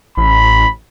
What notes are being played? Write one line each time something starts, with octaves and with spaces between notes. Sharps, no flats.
A1 B5